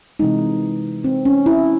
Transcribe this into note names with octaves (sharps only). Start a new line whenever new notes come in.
C3 E3 G#3 D#4
C4
C#4
E4